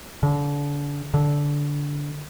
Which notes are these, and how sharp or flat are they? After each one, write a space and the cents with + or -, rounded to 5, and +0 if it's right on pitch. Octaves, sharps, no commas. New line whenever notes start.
D3 -30
D3 -15